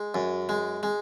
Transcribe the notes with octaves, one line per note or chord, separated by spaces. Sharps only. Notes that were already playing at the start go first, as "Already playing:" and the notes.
Already playing: G#3
F#2
G#3
G#3